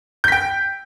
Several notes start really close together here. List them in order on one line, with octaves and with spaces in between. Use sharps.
G6 B6 G5